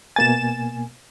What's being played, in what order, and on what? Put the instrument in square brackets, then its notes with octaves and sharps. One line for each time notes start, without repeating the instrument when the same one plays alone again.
[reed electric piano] B2 A#3 G#5 [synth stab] A6 E7